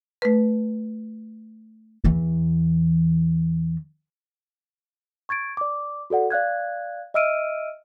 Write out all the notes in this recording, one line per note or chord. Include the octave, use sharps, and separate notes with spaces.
A3 B4
E2 E3
C#6 G#6 A6 D7
D5 D6
F#4 A4 D5 F#5
D5 F5 F#6 G#6
D#5 E5 E6 F6 D7 D#7